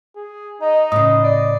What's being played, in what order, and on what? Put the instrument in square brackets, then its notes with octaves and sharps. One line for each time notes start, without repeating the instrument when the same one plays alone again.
[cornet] G#4
[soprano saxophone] D#4 [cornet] D#5
[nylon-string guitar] A2 C#3 [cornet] D#5 [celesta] D#6
[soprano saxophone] D5